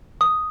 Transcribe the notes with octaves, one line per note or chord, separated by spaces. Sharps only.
D#6